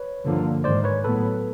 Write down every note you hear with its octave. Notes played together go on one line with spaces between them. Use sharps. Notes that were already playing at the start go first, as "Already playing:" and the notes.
Already playing: B4 C#5
G2 D3 F3 A#3
G#2 D#3 G#3 C5 D5
B4 C#5
A2 F#3 B3 A4 B4